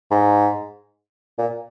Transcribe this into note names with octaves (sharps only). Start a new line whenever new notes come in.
G#2
A#2